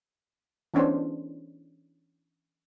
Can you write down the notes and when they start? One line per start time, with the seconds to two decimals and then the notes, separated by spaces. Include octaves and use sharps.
0.74 E3 B3 C#4 D4 C5